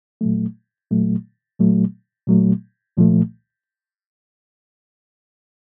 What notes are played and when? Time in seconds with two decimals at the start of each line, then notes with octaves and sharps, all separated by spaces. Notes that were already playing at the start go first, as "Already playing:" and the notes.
0.21 A#2 F#3 A3
0.90 A#2 F#3 A3
1.59 A#2 F#3 A3
2.28 A#2 F#3 A3
2.97 C2 A#2 F3 A3